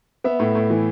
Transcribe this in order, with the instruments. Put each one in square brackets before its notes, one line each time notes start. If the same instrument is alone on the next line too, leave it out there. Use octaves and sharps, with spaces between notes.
[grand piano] B3 E5
A2
A2
E3